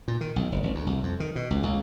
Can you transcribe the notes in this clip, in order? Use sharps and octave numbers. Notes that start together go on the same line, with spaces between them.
A#2
D#3
B1
F#1
G#1
D2
C2
F2
D#3
B2
C#2
C#2